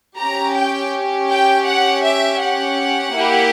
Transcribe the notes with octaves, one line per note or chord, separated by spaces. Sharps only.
C#4 G4 A#5
G5
G5
F#5
E5
F#5
A#3 E4 G4